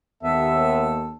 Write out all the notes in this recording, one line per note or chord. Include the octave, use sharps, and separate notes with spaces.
D#2 B3 A4 E5